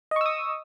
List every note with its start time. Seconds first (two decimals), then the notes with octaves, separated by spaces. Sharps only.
0.11 D#5
0.16 C#6
0.21 E6
0.26 D#6